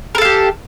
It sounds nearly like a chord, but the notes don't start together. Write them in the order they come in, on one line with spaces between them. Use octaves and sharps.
A#4 A4 F5 G4